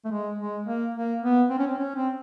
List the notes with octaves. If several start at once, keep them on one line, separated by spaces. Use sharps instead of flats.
A3
G#3
G#3
A#3
A#3
B3
C4
C#4
C4
C#4
C4